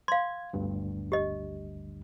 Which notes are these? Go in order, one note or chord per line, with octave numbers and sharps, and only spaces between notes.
F5 C6 G#6
G1 D2 G2
G4 D#5